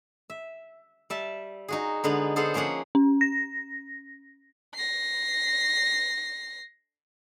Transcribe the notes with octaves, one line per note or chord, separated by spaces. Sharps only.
E5
G3 E5 A5
D#4 F#4 G#4
D3 G#3 B3 D#4
B3 G#4 A4 C5 F5 F#5
F3 A#3 C#4 G#4 F#5
C#4
A#6
A#6 C7